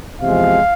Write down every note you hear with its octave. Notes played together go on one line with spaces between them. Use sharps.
E2 C3 F3 G#3 F5